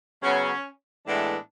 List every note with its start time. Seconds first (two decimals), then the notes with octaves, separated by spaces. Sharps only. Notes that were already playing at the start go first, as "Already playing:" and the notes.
0.23 C#3 F#3 B3 C#4
1.07 A2 E3 G#3 B3 D4